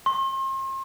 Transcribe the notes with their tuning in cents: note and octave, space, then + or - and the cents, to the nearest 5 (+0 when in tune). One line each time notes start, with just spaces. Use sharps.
C6 +40